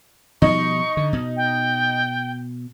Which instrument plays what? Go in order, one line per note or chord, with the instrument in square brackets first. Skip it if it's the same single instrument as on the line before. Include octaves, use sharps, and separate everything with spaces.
[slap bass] B2 F3 G3 [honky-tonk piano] D#4 [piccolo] C#6
[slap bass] D3
B2
[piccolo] G5